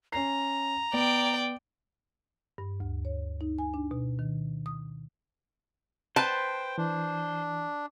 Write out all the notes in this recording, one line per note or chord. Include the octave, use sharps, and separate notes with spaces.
C#4 A#5 C7
B3 D5 G5
G2
D2
C#5
D#4
G#5
D4
B2
D#3
D#6
B4 C5 G5 A5
E3 D4